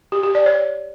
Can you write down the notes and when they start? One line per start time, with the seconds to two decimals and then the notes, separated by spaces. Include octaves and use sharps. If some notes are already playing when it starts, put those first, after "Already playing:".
0.12 G4
0.23 G4
0.35 D5
0.46 C#5